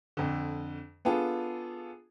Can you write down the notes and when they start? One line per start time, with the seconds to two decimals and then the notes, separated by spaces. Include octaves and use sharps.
0.17 F2 D3
1.05 B3 D4 F4 G#4 A4